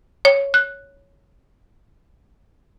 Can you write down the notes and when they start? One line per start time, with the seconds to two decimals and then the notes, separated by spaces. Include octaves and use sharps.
0.25 C#5
0.54 F#6